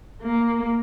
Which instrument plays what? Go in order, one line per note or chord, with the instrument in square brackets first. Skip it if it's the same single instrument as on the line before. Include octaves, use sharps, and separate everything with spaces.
[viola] A#3